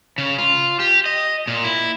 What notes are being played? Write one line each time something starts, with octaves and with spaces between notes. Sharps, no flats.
C#3
F4
G4
D#5
A#2
E4